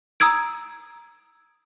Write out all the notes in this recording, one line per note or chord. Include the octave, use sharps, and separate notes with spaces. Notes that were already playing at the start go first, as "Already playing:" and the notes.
A#5 D#6 E6 G#6 D7